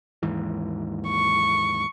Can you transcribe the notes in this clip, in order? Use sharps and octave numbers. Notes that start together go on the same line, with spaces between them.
D#2 G#2 E3
C#6